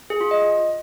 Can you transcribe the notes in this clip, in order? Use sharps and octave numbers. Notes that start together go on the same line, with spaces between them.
G#4
F4
D#5